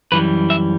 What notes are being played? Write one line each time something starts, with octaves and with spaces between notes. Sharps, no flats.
F#2 E3 G3 B4
E5